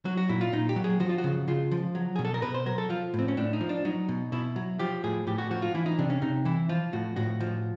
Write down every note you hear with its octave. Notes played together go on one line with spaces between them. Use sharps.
F#3 F#4
F#4
A#2 E4
F4
A#2 D#4
G4
F#3
G#4
F3 F#4
F4
F#4
C#3
C#3 F4
F3
F#3
B2 G#4
A4
A#4
B2 B4
C5
F#3 A#4
A4
F3 F4
A2
C4
C#4
A2 D4
D#4
F3
D4
F#3 D#4
B2
B2 E4
F#3
F3 G4
A2 G#4
A2 G4
F#4
F3 F#4
F4
E3 E4
D#4
C3 D4
C#4
C3 D#4
E3 E4
F3 F4
A2 F#4
A2 F#4
F3